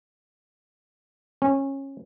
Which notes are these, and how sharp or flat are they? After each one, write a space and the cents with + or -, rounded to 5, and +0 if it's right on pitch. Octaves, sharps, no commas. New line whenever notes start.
C#4 -20